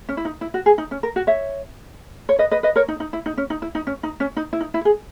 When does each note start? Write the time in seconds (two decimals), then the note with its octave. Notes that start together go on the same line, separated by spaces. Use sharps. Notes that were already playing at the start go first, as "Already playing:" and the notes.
0.09 C#4
0.17 E4
0.25 D#4
0.41 E4
0.54 F#4
0.66 G#4
0.78 D#4
0.91 C#4
1.03 A#4
1.16 F#4
1.27 C#5 E5
2.29 C#5
2.39 B4 D#5
2.51 B4 D#5
2.63 B4 D#5
2.76 A#4 C#5
2.88 D#4
3.00 D#4
3.13 E4
3.26 D#4
3.37 C#4
3.50 D#4
3.62 E4
3.75 D#4
3.87 C#4
4.03 D#4
4.20 C#4
4.37 D#4
4.53 E4
4.60 D#4
4.74 E4
4.85 G#4